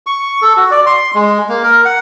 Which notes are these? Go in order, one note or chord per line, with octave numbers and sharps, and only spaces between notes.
C#6
A4
F#4
D5
C6
G#3
A#3
A#4
F#5